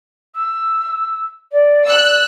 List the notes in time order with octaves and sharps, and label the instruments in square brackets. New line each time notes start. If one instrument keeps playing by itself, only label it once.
[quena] E6
D5
[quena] D5 [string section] E6 F#6